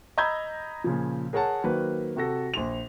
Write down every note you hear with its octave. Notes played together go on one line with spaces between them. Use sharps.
D#5 A#5 B5 E6 G6 G#6
A#2 C#3 F3
G#4 A#4 C#5 F#5 A5
D#3 F#3 A#3 B4 C5
C3 F#4 A4 A#6
A#1 C6 F7